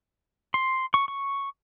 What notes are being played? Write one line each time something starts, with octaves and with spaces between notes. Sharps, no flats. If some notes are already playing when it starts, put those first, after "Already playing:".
C6
C#6
C#6